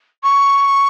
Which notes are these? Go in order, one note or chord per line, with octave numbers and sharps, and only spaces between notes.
C#6